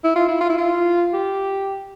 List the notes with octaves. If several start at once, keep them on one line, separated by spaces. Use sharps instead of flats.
E4
F4
E4
F4
E4
F4
G4